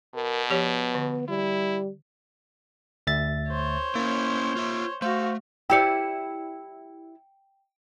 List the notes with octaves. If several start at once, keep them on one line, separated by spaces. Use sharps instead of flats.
B2 A#4
F3 B3 G4 C#5
D3
G3 E4
D2 E5 A6
C5 C#5
A#3 C#4 E4
F4 E5
A3 F#4 C5 F5
E4 G4 D5 G5 C#7